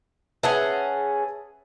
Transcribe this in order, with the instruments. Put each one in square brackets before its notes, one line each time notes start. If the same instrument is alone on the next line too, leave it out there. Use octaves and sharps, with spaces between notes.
[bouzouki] C#4 G#4 F#5 [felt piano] B4 E5 A5